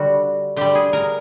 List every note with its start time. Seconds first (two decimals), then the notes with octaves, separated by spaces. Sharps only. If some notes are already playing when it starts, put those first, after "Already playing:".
Already playing: D3 G3 F#4
0.56 D3 G3 G4
0.75 G#4
0.93 A#4